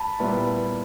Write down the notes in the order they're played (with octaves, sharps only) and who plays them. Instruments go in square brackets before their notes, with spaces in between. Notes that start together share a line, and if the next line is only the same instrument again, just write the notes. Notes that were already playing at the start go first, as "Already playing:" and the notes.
Already playing: [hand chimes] A5 B5
[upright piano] A#2 G3 B3 E4